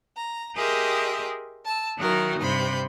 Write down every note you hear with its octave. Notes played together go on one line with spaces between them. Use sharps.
A#5
G4 G#4 A#4 D#5 E5 C6
A5 E6
D#3 F#3 D#4 E4 F#4 A#4
G2 C3 B5 C6 G6